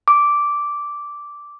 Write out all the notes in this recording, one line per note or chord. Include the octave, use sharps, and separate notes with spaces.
D6